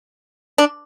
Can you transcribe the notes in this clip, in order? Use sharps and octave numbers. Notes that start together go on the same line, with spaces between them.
D4